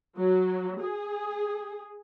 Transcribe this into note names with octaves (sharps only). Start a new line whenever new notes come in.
F#3
G#4